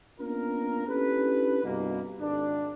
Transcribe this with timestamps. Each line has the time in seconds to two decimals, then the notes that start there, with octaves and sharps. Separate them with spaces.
0.20 A#3 B3 C#4 D4 F4 A#4
0.88 C#4 D4 E4 G4 A4 B4
1.64 C2 G2 B2 A#3
2.20 G#1 D4